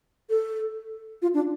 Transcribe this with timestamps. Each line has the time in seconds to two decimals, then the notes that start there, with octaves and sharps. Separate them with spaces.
0.30 A4
1.22 F4
1.34 D4